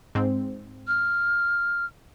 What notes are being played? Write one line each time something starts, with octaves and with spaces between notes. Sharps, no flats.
G#2 C4
F6